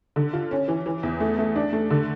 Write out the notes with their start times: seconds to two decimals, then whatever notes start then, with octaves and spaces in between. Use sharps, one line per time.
0.16 D3
0.33 F4
0.51 C#4
0.68 E3
0.86 E3
1.03 E2
1.20 A3
1.39 A3
1.56 D4
1.73 A3
1.90 D3